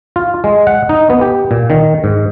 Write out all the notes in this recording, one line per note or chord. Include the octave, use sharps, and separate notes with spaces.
F4
G#3
F#5
D#4
B3
G4
A#2
D#3
G#2